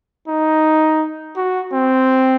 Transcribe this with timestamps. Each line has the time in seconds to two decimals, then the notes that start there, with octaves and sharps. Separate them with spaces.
0.28 D#4
1.36 F#4
1.73 C4